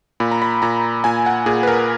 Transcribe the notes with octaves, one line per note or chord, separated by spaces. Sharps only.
A#2 B5
A#5
B5
A#2 A#5
A#2 G#5
F#5
A#2 G#4
B4
A#4